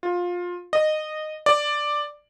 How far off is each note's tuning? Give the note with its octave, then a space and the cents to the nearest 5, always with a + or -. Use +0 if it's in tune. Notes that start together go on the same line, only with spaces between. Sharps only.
F4 +20
D#5 -15
D5 +5